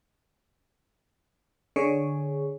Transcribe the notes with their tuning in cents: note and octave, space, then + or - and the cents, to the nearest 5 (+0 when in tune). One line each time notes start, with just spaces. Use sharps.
D3 +5 G#4 +0 C#5 +0